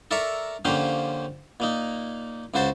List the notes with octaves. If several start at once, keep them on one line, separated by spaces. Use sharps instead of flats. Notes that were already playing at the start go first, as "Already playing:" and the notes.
A4 A#4 D5 E5 A#5 C#6
D3 F3 A#3 C#4 G4 C5
A#2 A#3 D#4
C#2 C#3 F#4 C5 A5